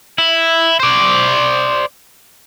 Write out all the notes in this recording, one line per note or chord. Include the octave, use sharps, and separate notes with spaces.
E4
C5 D5